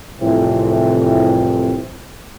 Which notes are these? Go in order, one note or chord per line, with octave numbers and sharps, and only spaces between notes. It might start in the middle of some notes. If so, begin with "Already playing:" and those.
C2 F2 A2 C3 E3 C4